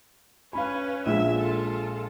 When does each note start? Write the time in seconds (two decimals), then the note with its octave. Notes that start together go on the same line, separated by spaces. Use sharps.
0.53 C#4 B4 F5 B5
1.06 A#1 G#3 E5
1.39 F4 A4